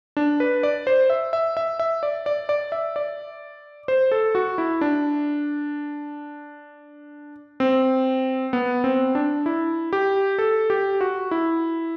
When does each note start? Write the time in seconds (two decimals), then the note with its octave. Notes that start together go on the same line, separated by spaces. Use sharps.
0.17 D4
0.40 B4
0.63 D5
0.87 C5
1.10 E5
1.33 E5
1.57 E5
1.79 E5
2.03 D5
2.26 D5
2.49 D5
2.72 E5
2.96 D5
3.88 C5
4.12 A4
4.35 F#4
4.58 E4
4.81 D4
7.60 C4
8.53 B3
8.84 C4
9.15 D4
9.46 E4
9.93 G4
10.39 A4
10.70 G4
11.01 F#4
11.31 E4